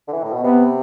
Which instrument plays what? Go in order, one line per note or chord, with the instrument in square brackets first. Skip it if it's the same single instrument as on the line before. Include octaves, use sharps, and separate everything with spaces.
[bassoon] D3
E3
A2
B2
[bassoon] C3 [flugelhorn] B3